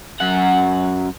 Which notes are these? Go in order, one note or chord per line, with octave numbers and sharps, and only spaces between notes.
F#2 F#5